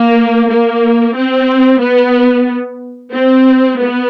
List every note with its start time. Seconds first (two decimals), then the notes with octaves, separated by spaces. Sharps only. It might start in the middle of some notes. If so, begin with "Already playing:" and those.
Already playing: A#3
0.49 A#3
1.15 C4
1.81 B3
3.12 C4
3.79 B3